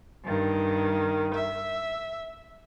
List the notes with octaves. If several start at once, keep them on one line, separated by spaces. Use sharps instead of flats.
G2 D#3
E5